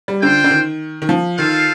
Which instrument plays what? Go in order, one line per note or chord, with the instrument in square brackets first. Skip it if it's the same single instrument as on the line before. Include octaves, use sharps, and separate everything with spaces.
[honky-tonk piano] G3
[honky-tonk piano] D3 [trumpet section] F4 C5 G5
[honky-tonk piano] D3
D#3
D#3
F3
[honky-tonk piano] D#3 [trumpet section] F4 A4 C5 F5